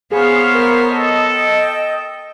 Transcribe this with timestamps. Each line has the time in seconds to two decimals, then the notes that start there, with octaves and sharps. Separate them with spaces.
0.12 B3 G#4 C5 C#5 F5
0.55 A#4
0.91 A4 D#5
1.30 G5